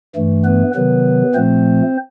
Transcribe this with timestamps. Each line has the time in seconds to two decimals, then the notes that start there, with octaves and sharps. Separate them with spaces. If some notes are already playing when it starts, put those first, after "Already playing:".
0.16 G2 E3 A3
0.45 B3 B4
0.74 C3 D#3 F#3 B3 B4
1.35 A#2 F3 A3 C4 C5